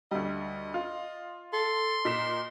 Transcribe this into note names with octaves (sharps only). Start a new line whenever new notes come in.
D2 G3 D#5
F4
A4 C6
A#2 D#5 B6 E7